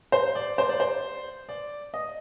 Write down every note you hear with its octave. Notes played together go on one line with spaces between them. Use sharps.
C5
D5
C5
D5
C5
D5
D#5